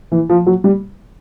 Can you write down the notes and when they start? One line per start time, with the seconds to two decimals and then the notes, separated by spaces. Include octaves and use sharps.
0.12 E3
0.29 F3
0.46 F#3
0.64 G3